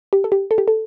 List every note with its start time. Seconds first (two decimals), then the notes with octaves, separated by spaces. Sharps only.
0.13 G4
0.24 A4
0.32 G4
0.51 A4
0.58 G4
0.68 A4